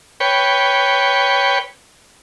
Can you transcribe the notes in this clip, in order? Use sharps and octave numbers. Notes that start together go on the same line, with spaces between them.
B4 C#5 G5